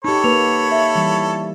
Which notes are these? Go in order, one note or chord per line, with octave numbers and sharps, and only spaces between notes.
D#4 G4 A4 C#5 B5
A#3 B4 F7
E5
E3 G3